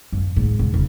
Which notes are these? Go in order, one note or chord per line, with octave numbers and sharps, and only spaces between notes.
F#2
G#2
E1
C#3